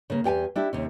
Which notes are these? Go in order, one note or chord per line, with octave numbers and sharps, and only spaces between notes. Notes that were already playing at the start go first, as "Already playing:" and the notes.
C#3 A#3
E2 G4 G5 G#5
D4 E4 G4
D#2 C3 C#4